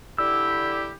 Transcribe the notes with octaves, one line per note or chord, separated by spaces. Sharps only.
D3 E4 G4 E6